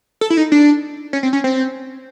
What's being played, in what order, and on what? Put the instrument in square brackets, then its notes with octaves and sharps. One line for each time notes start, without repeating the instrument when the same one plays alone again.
[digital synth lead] A4
E4
D#4
D4
C#4
C4
C#4
C4